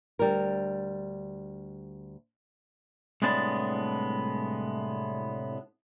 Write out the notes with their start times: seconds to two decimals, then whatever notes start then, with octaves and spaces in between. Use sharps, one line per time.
0.19 D2 G3 A#4
3.22 C2 A2 G#3 B3 D4 A5